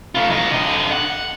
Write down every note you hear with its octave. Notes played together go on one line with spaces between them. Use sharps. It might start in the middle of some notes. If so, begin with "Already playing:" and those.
A3 F4
F#3 D#5
D3 D#5
F#5